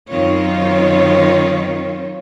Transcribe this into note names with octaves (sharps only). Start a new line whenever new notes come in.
F#2 D#3 C4 F4 C#5